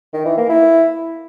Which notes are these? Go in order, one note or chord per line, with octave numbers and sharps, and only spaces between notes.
D#3
E3
A#3
E4